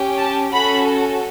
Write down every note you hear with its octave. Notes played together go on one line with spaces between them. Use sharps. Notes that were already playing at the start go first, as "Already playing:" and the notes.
Already playing: C#4 G4
A5
C#4 F#4 A4 B5